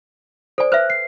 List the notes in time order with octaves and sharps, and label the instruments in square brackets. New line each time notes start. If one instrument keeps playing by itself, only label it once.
[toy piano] A4 G#5 [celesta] C5 D5
[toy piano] B4 C5 E5 [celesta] F#6
[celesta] C7